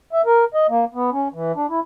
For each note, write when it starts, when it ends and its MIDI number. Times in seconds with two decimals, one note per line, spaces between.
0.13 0.22 76
0.26 0.45 70
0.54 0.67 75
0.69 0.85 58
0.95 1.10 59
1.12 1.28 61
1.34 1.52 52
1.56 1.66 62
1.69 1.80 64